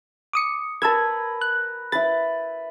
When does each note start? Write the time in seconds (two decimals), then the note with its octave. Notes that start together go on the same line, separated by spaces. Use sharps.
0.33 D6 D#6 C#7
0.82 A#4 B4 A5 E6 G#6
1.41 F#6
1.92 E4 B4 A6